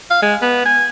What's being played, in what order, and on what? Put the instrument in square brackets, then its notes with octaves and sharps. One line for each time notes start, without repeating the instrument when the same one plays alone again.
[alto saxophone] F5
G#3
B3
G#5